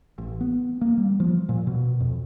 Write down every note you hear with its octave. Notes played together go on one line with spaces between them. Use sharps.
A1
B3
A#3
G3
F3
A#2
B2
F2